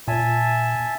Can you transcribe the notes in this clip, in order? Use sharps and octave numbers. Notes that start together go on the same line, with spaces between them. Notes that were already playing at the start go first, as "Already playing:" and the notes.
A#2 E5 G#5 A5